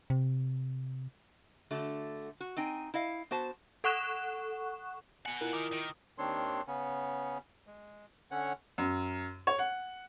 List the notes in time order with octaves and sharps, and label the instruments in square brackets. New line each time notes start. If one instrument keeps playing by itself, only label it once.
[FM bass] C3
[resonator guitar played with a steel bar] D3 A3 F#4
F#4
C4 D#4 G5 G#5
E4 D#5 F5
B3 F#4 C5 A5
[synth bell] A4 F#5 C#6 F#6 E7
[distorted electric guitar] B2 F#5 [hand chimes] G#5
[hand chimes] E4 F4 A#4
[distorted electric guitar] D#3 A#4 [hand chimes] D6 D#6
[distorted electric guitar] D#3
[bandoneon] D#2 D#3 C4 D4 C#5 C6
C#3 B3 C#4
G#3
D3 C#4 C#5 F#5
[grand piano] F#2
C#5
F#5